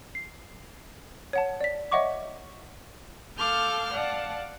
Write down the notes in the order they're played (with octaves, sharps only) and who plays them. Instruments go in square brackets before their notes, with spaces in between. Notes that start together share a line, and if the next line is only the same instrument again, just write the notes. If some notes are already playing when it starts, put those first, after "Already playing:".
[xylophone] C7
C#5 F#5 A5
D5 B6
C#5 D#5 E5 F#5 C#6 D6
[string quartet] A4 F5 A5 D6 F6 G6
D5 F5 F#5 A5